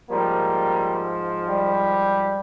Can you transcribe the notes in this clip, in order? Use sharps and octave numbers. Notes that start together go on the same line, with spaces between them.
G#2 F3 G3 A#3
G3